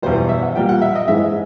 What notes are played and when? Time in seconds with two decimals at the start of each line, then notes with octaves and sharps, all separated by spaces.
0.02 E2 B2 G3 C5
0.29 E5
0.42 F#5
0.56 A#2 G3 A#3 G5
0.69 F#5
0.82 E5
0.95 D#5
1.08 G#2 E3 G#3 E5